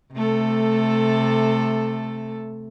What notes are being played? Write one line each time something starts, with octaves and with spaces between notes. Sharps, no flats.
C3 A3 A4